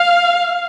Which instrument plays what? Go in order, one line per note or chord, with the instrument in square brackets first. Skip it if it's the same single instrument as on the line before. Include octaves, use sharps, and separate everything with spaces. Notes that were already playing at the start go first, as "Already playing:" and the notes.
Already playing: [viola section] F5